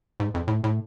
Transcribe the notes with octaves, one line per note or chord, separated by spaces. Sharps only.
G#2
F2
A2
A2